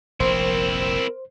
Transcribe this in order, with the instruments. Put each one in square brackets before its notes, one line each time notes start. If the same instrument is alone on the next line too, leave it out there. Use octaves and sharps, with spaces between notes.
[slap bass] F1 A#1 [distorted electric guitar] C4 E4 [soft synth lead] A#4 [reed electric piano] C5